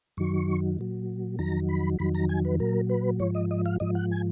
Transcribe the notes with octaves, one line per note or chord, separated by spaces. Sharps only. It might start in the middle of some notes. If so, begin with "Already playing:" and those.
F#2 D#3 F#3 C#6
A#2 F#3
F2 D#3 F#3 A#5
B5
F2 D#3 F#3 B5
A#5
G#5
B4
A#2 F#3 A#4
B4
G#2 F3 C#5
D#5
D#5
F5
G#2 F3 D#5
F#5
G#5